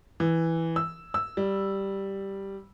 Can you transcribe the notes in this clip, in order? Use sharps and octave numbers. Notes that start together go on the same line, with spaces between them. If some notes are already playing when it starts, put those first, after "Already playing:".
E3
E6
E6
G3